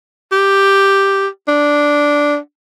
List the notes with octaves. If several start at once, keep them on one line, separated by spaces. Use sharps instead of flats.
G4
D4